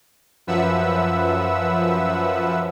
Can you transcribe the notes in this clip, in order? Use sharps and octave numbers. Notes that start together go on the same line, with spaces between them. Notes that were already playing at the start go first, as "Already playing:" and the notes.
F#2 F3 B4 E5 F#5 E6